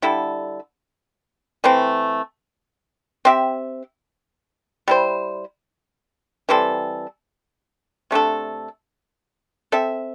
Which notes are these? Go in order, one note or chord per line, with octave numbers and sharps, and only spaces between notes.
D3 G3 E4 A4
E3 A3 C4
C4 G4 E5
G3 E4 C5
E3 G3 C4 A4
C3 A3 D4 A4
C4 A4 E5